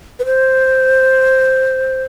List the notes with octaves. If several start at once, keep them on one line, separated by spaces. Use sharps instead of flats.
B4
C5